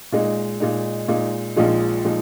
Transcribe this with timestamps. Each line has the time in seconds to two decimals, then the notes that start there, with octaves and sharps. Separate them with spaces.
0.12 A#2 G#3 D#4
0.60 A#2 G#3 D#4
1.08 A#2 G#3 D#4
1.56 A#1 A#2 F3 G#3 D#4
2.05 A#2 F3 G#3 D#4